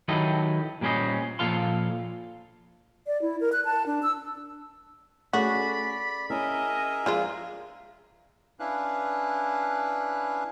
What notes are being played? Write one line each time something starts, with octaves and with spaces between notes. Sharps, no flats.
D#3 F#3 E4 G4 A4 D#5
A#2 G3 C#4 C5 D#5
A#2 F3 A4 F5 C6
D5
E4
A#4
F#6
A5
D4
E6
A3 C#4 F#4 G#4 D5 B5 B6
C#4 E4 G#4 A#4 D#5 E5
F3 G#3 F4 D5
C#4 D4 E4 B4 F5 F#6